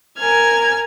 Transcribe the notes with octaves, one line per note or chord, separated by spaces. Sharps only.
A#4 G#5 F6 G#6